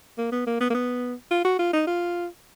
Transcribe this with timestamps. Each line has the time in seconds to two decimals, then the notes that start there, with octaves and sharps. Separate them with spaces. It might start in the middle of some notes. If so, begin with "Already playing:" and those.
0.18 A#3
0.32 B3
0.47 A#3
0.61 B3
0.70 A#3
0.74 B3
1.31 F4
1.45 F#4
1.59 F4
1.73 D#4
1.87 F4